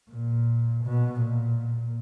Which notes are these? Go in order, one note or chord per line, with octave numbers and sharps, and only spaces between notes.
A#2
B2
A#2